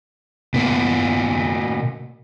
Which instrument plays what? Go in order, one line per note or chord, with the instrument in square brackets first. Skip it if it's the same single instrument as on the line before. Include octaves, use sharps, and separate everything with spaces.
[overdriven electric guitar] B2 A#3